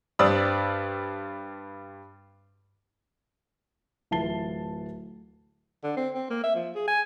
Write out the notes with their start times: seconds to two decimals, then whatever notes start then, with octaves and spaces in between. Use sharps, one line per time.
0.19 G2 C4 D5 B5 D#6 E6
4.11 D1 E3 F4 A5 C7 G7
5.83 D3
5.97 C4
6.14 C4
6.30 A#3
6.43 E5
6.55 F3
6.75 G#4
6.88 G#5